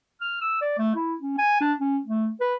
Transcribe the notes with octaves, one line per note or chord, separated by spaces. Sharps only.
F6
E6
D5
A3
E4
C#4
G#5
D4
C#4
A3
B4